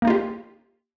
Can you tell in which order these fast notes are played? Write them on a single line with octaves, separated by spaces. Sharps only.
A#3 D#4 F4 G4